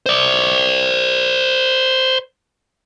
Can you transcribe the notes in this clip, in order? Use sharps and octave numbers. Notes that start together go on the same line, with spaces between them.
C5 D5